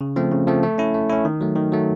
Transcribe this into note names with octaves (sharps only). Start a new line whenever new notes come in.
C#3
F3 A3 C4
C#3
F3 A3 C4
A3
C#4 E4
A3
C#4 E4
D#3
F#3 A3
D#3
F#3 A3